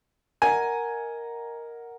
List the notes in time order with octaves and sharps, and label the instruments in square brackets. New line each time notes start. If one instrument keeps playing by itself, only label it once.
[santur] A#4 D#5 F#5 [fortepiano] G#5